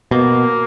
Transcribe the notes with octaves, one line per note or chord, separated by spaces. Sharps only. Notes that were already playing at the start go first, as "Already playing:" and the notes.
B2 A#3